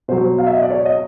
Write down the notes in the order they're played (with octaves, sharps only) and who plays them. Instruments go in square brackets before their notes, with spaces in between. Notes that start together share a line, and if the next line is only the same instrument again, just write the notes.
[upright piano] B2 F#3 C5
F5
E5
D#5
D5
C#5
D#5